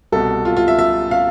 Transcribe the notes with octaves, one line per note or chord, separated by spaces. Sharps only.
C2 B2 A4
F4
F4
E5
E5
F5